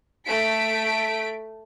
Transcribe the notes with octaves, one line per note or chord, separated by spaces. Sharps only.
A3 B6 D7